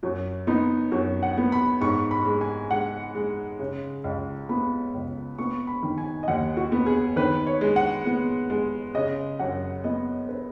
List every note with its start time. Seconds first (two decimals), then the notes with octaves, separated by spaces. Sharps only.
0.03 F#2 F#4
0.47 B3 D#4
0.92 F#2 F#4
1.23 F#5
1.37 B3
1.52 B5
1.81 G#2 C#6
2.11 B5
2.25 G#3
2.41 G#5
2.71 G#3 F#5
3.15 G#3
3.59 C#3
4.04 C#2
4.49 B3 B5
4.94 C#2
5.39 B3 C#6
5.67 B5
5.83 D#3
5.98 G#5
6.23 D#5
6.28 D#2 F#5
6.57 F#4
6.72 B3
6.86 G#4
7.16 D#3 B4
7.47 C#5
7.61 G#3
7.76 F#5
8.06 B3
8.50 G#3
8.94 C#3 D#5
9.39 F#2 F#5
9.84 B3 D#5
10.29 B4